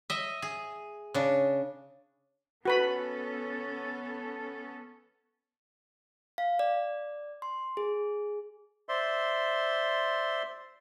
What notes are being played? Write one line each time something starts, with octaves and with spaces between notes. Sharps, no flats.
D#5 E5
G#4
C#3 D4
B3 C#4 F#4 A4 B4 B5
F5
D5
C6
G#4
C5 D5 E5 C6